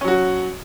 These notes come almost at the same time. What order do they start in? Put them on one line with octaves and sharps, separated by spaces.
C#4 F#3 F#4